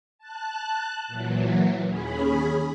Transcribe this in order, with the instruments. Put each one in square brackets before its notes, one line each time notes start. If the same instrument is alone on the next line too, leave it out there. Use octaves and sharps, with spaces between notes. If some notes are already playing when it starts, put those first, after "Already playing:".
[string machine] A5 F#6
A#2 E3 F#3
D#2 C#4 G#4 B5